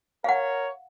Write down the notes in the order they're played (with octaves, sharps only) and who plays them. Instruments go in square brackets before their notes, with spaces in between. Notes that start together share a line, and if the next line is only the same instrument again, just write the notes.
[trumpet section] A#4 C#5 [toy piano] F5 F#5